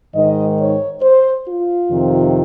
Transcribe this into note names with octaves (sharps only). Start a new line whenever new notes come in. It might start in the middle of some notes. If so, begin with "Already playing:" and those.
G#2 D#3 D#5
C#5
C5
F4
F2 C3 D#3